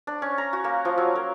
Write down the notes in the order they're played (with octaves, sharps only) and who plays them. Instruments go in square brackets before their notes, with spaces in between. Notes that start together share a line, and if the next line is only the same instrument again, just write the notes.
[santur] D4
C#4
A#5
F#4
A#3
F3
F#3
A#4